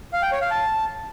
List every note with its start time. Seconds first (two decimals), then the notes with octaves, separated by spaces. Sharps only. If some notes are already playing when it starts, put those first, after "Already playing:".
0.13 F5
0.22 G5
0.32 C#5
0.41 F5
0.51 A5